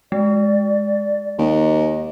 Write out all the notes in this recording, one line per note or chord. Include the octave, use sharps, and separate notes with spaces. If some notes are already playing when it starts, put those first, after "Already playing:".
G#3 D5
D#2 D#5